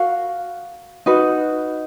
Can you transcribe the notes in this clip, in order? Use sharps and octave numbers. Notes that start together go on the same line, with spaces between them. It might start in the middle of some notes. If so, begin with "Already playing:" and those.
Already playing: F#4 A#4 F5
D#4 F#4 B4